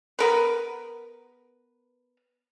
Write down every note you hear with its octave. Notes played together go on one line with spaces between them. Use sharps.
B3 A#4 B4